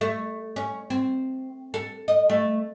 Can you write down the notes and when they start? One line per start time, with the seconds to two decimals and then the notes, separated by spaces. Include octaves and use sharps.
0.01 A3
0.56 C#4
0.90 C4
1.74 A4
2.08 D#5
2.30 A3